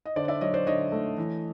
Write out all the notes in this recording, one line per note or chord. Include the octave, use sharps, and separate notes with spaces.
D#5
D3 C5 D5
D5 E5
F#3 C#5 D#5
C5 D5
D3 C#5 D#5
A3
E3